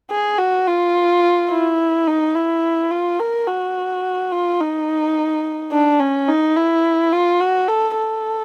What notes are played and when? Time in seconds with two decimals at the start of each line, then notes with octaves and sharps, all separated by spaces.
0.11 G#4
0.38 F#4
0.67 F4
1.50 E4
2.07 D#4
2.35 E4
2.91 F4
3.19 A#4
3.47 F#4
4.32 F4
4.60 D#4
5.72 D4
6.00 C#4
6.28 D#4
6.56 E4
7.12 F4
7.40 F#4
7.68 A4
7.97 A4